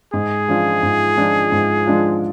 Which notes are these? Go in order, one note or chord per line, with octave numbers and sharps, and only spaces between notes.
G#2 G#4
F3 G#3 D4 F4
G#2
F3 G#3 D4 F4
G#2
F3 G#3 D4 F4